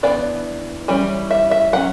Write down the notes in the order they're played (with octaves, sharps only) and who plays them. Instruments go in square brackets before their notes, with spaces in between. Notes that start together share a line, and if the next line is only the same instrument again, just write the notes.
[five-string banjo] E3 B3 D4 D5
E3 G3 C#4
E5
E5
F#3 C#4 F#5